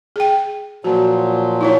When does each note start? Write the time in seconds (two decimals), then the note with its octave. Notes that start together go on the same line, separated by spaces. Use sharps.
0.16 G#4 G5
0.84 A#2 F3 F#3 F#4
1.61 D#4 E4 C#5